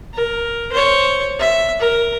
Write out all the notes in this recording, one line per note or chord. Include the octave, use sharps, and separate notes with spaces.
A#4
C5 C#5
E5
A#4